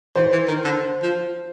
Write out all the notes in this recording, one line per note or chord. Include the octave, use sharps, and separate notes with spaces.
E3 C5
E3
D#3
D3
F3